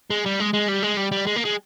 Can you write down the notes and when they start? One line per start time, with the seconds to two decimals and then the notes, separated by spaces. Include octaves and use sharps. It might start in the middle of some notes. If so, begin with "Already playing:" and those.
0.11 G#3
0.26 G3
0.40 G#3
0.54 G#3
0.69 G3
0.83 G#3
0.97 G3
1.12 G3
1.27 G#3
1.36 A#3
1.45 G#3